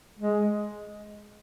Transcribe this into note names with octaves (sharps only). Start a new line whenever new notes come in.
G#3